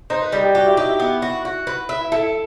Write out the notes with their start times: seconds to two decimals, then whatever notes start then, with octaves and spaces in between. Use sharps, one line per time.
0.10 D#4 C5
0.22 B4
0.32 G3
0.44 G4
0.55 F#4 G4
0.66 E4
0.77 D#4 G4
0.89 E4
1.00 B3
1.22 F#4
1.45 F#4
1.67 B4
1.89 E5
2.01 E4
2.12 E4 A4
2.23 E4